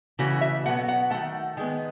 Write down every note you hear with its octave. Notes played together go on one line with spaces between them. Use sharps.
C#3 E3 A3 F#4
E5
B2 F#3 B3 F#5
F#5
D#3 A3 F#5
D#3 G#3 B3